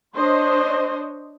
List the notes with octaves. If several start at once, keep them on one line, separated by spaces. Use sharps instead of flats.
D4 C5 C#5 D#5